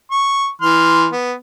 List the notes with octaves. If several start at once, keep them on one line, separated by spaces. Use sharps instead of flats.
C#6
E3 C6 F6
B3